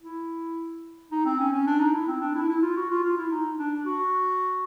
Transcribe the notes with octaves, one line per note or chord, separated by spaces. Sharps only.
E4
D#4
C4
C#4
C#4
D4
D#4
E4
C4
D4
E4
E4
F4
F#4
F4
F4
E4
D#4
D4
F#4